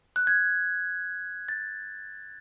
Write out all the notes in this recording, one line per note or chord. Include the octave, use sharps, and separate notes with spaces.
F#6
G#6
A6